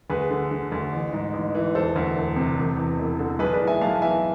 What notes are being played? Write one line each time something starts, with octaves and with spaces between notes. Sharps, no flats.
D2 G#4 B4
D3
D3
D2
A1
G#2
A1
E3
E1 A4 C5
D2
E1
C3
E1
E2
E1
D3
B1 G#4 B4
B4 D5
A2
E5 G#5
B1 F5 A5
E3 E5 G#5